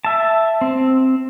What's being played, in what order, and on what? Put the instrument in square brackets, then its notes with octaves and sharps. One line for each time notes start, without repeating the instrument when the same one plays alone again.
[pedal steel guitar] E5 A5
C4